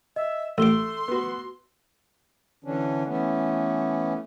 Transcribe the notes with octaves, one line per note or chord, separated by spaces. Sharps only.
D#5 E5
A1 A3 C6 D6 E6 G7
B3 F#4
D3 E3 C#4 D4
E3 A3 B3 C#4